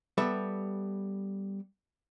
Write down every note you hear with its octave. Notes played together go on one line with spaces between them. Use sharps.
G3 B3 A4 E5